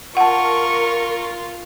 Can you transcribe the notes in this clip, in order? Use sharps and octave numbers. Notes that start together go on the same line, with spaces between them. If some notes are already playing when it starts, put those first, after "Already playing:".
F4 A#4 F#5 A5 C#6